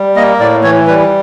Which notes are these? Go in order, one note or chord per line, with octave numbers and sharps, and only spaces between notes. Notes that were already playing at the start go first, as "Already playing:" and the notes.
Already playing: G3
A#3 D#5
A2 D5
E3 C#5
G3 B4